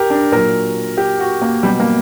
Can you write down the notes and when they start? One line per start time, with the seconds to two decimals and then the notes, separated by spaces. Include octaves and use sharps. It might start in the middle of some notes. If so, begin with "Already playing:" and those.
Already playing: G4 A#4
0.10 D4
0.32 A#2 F#3 A#4
0.97 G4
1.20 F#4
1.42 A#3
1.63 B2 F#3 G3
1.80 A#3